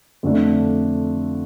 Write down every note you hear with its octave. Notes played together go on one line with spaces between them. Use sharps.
F2 D3 A3 D4